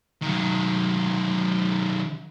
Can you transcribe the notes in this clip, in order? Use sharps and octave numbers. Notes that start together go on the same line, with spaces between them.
D#3 F#3